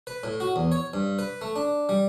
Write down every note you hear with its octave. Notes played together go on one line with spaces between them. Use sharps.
B4
A2
F#4
E2
C#5
G2
B4
A3
D4
G3